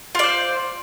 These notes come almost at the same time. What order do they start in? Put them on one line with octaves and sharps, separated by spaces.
F4 D5 C5